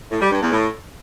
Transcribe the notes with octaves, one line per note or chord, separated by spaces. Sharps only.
A2
G3
G2
E2
A2